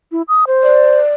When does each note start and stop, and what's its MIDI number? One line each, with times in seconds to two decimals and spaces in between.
0.12 0.22 64
0.28 0.44 87
0.47 1.00 72
0.63 1.15 74